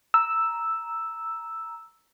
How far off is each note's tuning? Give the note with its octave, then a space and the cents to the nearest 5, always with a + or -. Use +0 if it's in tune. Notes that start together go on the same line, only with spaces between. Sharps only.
A#5 +0 E6 +0